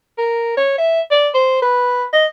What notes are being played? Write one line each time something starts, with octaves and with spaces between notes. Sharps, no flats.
A#4
C#5
E5
D5
C5
B4
D#5